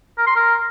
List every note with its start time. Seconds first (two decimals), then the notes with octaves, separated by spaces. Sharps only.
0.18 A#4
0.27 C6
0.36 A#4